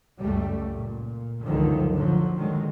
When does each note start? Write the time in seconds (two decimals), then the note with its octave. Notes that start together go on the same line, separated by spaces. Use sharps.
0.19 C#2 F#2 G3 A3
0.73 A#2
1.45 C#2 F#2 D3 D#3 F3 F#3
1.92 A2 D3 F3 F#3
2.36 D3 D#3 F#3 G#3